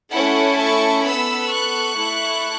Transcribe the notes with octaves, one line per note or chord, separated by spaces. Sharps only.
A3 C#4 E4 A4 C#5 F#5
A5 C#6
B3 A4 B5 E6
C#6 F#6
A3 E4 A4